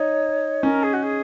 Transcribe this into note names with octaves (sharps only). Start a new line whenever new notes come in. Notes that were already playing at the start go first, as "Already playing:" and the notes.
Already playing: D#4 C#5
C#4 A#4
G#4
F#4
G#4